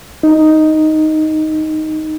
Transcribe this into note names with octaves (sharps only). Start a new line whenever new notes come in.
D#4